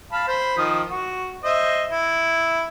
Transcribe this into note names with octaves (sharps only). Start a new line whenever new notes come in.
F5 A5 B5
C5 B5
D#3 F3 D#6
F#4
C5 D#5 E5
E4